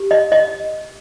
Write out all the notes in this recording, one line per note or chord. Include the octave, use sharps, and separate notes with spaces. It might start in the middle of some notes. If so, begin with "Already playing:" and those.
Already playing: G4
D#5
D#5